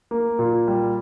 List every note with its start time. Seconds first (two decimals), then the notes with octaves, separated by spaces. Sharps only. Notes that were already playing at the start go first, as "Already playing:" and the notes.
0.11 A#3
0.39 A#2
0.67 G3